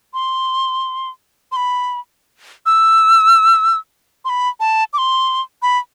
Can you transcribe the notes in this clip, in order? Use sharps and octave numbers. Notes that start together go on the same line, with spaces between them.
C6
C6
B5
E6
C6
B5
A5
D6
C6
B5